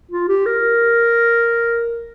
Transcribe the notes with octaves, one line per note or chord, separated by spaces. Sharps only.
F4
G4
A#4